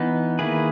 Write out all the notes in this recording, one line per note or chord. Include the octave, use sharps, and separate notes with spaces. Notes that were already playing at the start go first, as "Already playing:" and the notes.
Already playing: E3 B3 D#4
D#3 A#3 E4 G#4 B4